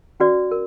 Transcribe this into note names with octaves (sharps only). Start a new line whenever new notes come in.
C#4 F#4 B4 D5
A#4